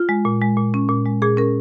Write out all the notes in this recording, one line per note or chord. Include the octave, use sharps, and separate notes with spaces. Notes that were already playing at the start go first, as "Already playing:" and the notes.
Already playing: F4
G#3
A#2
G#3
A#2
C#4
A#2
G#3
A#2 G#4
C#4 A#4